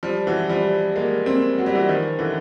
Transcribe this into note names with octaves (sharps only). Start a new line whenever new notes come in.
F3 G3
E3 F#3
F3 G3
G#3 A#3
A#3 C4
F#3
G3
E3 F#3
D#3 F3
D3 E3